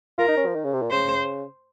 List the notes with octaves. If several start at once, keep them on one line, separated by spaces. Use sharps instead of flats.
F4 A#4
D#4
C#4
F3
D#3
C#3
C3
A#2
C#3 C5